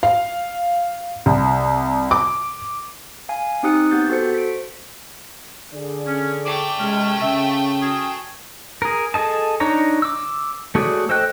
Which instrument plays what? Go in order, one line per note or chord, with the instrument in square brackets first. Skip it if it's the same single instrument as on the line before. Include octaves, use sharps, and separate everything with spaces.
[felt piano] F5
C2
D6
[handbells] F5 G#5
C4 D#4 G4 D#6 F#6 C#7
B3 G4 G6 A6
F#4 A4 C5 C#7
B6 D7
[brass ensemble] D3 G#4 D5
[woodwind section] C#4
[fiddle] A3 G5 [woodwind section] D6
[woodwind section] C3 C#4 [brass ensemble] G#3
[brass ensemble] C#3 [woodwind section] E5
[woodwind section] C#4 F#4 G#4
[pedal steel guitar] G#4 A#4
G#4 A4 D#5 A5
D4 D#4 C#5 A#5
D6 E6
A3 F#4 G#4 C#5 D5
A4 C5 D#5 G5 F#6